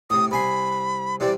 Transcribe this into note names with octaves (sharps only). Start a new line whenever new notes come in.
A2 C3 D#6
C2 G#5 B5 C6
C3 E3 G3 D5